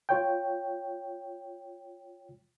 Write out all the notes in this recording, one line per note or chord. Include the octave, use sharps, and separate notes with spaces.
F4 C#5 G5